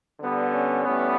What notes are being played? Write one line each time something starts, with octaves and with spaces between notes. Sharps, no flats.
D3 G3 B3
C#4
A2 G3 B3